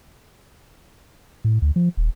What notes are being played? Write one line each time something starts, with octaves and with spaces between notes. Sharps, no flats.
A2
D2
F3
D#1